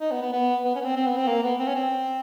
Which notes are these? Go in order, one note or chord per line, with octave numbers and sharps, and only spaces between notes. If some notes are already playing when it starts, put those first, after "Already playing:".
D#4
B3
B3
B3
B3
C#4
B3
C4
C4
B3
C4
A#3
B3
C4
C#4
C4